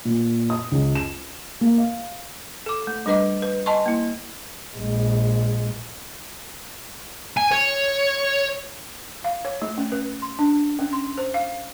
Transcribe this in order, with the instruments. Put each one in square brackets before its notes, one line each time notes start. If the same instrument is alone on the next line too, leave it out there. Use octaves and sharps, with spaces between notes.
[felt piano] A#2
D#6
C#2
E7
A#3
F5
[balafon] A4 D6
A3
G3 D4 B4 D#5 D6
B4
D#5 G#5 A5 C6 C#6
A#3 E4
[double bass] A#1 G#3
[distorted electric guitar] G#5
C#5
[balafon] F5
C#5
A3
C#4
B4
C6
D4
C#4
C6
C5
F5